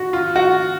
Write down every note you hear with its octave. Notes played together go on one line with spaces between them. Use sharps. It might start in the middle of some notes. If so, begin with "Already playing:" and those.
Already playing: F#4
F4
F#4